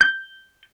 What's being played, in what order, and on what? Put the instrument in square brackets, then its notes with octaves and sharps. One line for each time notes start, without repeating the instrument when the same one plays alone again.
[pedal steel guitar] G6